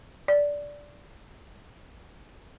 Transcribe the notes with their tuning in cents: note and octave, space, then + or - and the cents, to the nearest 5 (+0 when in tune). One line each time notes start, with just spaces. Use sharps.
D5 -10